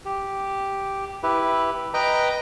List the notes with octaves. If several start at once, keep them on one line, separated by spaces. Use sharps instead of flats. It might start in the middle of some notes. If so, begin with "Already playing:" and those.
G4
E4 G4 B4
B4 D#5 G5 A#5